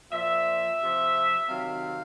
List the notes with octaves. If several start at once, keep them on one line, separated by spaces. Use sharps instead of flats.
A#2 F3 E5
C3 F3
C3 D#3 F#3 F5